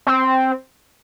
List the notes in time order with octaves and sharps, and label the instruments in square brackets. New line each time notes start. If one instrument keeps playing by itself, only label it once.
[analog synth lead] C4